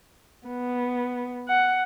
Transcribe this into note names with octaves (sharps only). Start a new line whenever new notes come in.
B3
F#5